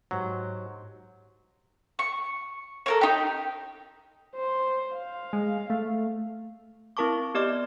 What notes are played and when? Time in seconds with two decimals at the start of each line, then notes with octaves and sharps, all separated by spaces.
0.11 G#2 F#3 G4 C5
1.99 C#6
2.86 A4 A#4 C#5
3.01 D#4 G4
4.35 C5
4.95 F5
5.33 G#3
5.70 A3
6.97 C4 E4 A#4 A5 C#6 D6
7.34 B3 G4 D5 D#5 D6 F6